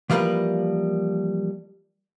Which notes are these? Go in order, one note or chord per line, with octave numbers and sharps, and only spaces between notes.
E3 F3 G3 A#3 A#4 B4